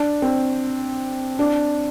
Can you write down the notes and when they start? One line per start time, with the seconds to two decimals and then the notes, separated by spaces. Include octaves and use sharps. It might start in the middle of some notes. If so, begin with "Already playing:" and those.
Already playing: D4
0.22 C4
1.39 D4